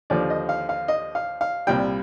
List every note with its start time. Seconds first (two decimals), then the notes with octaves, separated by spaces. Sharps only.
0.10 D#2 D3 F3 D5
0.30 D#5
0.49 F5
0.69 F5
0.88 D#5
1.15 F5
1.41 F5
1.67 C2 A#2 G3 G5